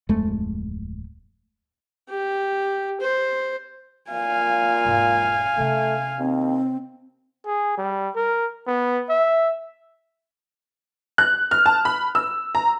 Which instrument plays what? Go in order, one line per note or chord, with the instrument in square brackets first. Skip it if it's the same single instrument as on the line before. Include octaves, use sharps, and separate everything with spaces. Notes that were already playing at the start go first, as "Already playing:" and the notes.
[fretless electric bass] D1 F2 G#3 A3
[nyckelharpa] G4
C5
[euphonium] A#2 [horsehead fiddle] F5 G#5
[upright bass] E1 G#2
[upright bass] C3 C#4 [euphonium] A3
[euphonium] D#2 [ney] C4
[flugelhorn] G#4
G3
A#4
B3
E5
[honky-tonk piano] F#6
F6
A5
B5
E6
A#5